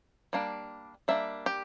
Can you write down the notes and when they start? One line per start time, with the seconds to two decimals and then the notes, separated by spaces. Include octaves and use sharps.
0.33 G3 A#3 D4
1.08 G3 A#3 D4 E5
1.46 G4